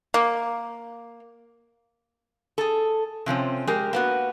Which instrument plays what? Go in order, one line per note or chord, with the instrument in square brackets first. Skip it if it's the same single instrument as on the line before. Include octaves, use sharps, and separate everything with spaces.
[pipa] A#3
[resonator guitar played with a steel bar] G#4 A4
C3 F3 C4 C#4
G#3 G4 A#4
A#3 B3 F#4